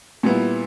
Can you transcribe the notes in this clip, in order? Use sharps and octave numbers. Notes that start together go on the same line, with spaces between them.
A#2 G3 B3 E4